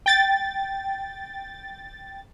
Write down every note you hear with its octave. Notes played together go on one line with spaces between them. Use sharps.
G5 A6